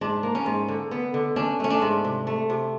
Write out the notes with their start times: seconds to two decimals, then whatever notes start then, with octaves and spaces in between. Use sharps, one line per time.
0.01 G#2 D4
0.23 A#3
0.35 C#4
0.46 G#2
0.68 D3
0.91 B3
1.14 D3
1.36 C#4 D4
1.60 A3 C#4
1.70 D4
1.82 G#2
2.05 C3
2.27 A3
2.50 C3